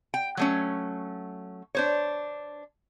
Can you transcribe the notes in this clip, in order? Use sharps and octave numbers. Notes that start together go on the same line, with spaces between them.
G5
F#3 A3 C#4
D4 C5 C#5